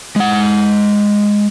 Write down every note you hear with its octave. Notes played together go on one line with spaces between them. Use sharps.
G#3 F#5